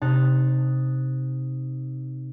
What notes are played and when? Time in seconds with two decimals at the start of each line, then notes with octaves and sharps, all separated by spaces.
0.01 C3 D#4 A5 F#6